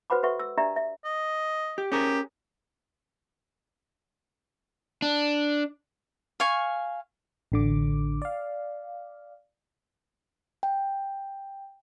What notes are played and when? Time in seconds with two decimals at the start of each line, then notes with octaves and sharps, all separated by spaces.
0.10 F#4 B4 C5 F#5 B5 D6
0.23 F#4 A4 B4 E5 F#5 C#6
0.39 E6
0.57 D4 G4 D5 E5 A#5
0.76 E5
1.04 D#5
1.78 G4
1.92 C#4 G4 G#4 A#4
5.02 D4
6.40 F5 G#5 C#6
7.52 A1 D3 D6
8.22 D5 F5
10.63 G5